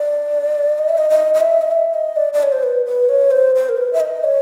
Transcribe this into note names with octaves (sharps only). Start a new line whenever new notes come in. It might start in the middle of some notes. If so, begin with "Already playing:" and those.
Already playing: D5
D#5
E5
D#5
D#5
D#5
E5
D#5
E5
D#5
D5
D5
C#5
C5
B4
B4
C#5
C5
C5
A#4
B4
E5
D#5
C#5